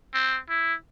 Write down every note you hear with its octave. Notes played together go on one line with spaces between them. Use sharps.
C4
E4